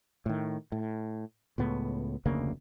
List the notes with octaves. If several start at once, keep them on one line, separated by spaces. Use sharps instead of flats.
A2 D#3
A2
C#2 A2 B3
F1 D2 C#3 A#3